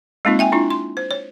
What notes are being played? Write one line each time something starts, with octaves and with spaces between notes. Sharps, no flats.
G#3 A#3 C4 D#4 F4
E5 G5 G#5
D4 E4 F4
C6
C5
C#5